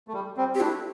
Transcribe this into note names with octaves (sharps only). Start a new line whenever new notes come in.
A3
G3
G3 C4
C4 G4
A3 D4 E4